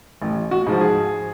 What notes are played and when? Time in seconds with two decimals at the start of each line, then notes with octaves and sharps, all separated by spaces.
0.22 A1
0.51 F#4
0.67 G#2 F3
0.81 G#4